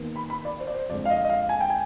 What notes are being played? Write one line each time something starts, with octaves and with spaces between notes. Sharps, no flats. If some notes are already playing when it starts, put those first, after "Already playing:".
Already playing: D#2 D#3 B3
B5
B5
D5
C5
D5
C5
F2 D3 G#3 D5
F5
D#5
D#5
F5
G#5
G5
G#5